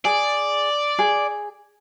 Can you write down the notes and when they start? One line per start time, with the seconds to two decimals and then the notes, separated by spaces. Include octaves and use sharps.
0.05 G#4 D5
0.99 G#4